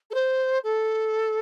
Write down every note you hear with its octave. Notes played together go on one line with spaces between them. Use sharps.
A4
C5
A4